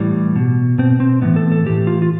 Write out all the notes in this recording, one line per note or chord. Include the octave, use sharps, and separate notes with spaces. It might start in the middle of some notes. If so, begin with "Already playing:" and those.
Already playing: A2 E3 G3
B2
B2 C4
C4
A2 E3 B3
A4
A4
A2 E3 G4
F4
F4